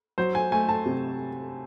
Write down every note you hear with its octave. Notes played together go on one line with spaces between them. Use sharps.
F#3 C5
G#5
A3 G#5
A5
C3